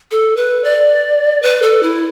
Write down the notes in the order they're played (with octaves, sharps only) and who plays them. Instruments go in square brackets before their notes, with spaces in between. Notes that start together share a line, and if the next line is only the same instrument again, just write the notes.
[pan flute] A4
B4
D5
B4
A4
E4